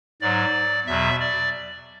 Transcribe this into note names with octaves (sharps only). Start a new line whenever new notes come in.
G#2 F#3 D5
E2 B2 F#3 E5
D5